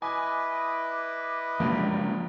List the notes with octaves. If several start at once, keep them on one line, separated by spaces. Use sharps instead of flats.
E4 B4 D#5 G#5 D6
C#2 G2 F3 F#3 G#3 A#3 F4